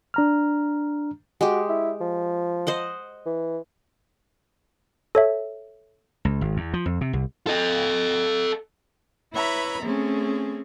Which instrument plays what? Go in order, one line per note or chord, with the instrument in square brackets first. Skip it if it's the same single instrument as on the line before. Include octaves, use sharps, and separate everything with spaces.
[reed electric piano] D4 A#5 F6
[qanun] G#3 G4 [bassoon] F#4
[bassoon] E4
F3
[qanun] C5 D#5 F#5
[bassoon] E3
[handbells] A4 C#5 E5
[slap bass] C#2
G#1
E2
F3
F2
C3
C2
[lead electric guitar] A4 D#5
[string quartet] E4 B4 C#5 E5 A#5 B5
A3 C4 C#4 G#4